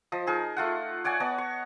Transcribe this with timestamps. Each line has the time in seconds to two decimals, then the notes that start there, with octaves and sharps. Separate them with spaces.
0.12 F3 D#5
0.27 D#4 G#4 A#4
0.57 A3 F4 F#5
1.04 C#5 D5 F#5 G#5
1.20 B3 C#5 D#5 A5
1.38 C#6